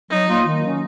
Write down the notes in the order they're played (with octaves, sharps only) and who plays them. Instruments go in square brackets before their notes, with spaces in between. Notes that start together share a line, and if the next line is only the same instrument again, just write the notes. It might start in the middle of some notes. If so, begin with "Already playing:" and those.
[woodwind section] F#3 [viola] D#4
[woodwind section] A#3 F4
D#3
F#3 C#4